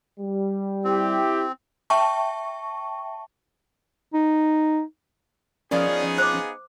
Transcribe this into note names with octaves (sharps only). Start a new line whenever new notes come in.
G3
C4 E4 G4
E5 G5 A5 C#6
D#4
F3 B3 C#4 D#4 G#4 A#4 D5 F5
C5 F5 D6